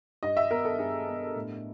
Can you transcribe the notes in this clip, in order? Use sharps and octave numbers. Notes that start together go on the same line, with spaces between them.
G2 D#5
E5
B3 A#4
A4
G2 G#4
B3
A2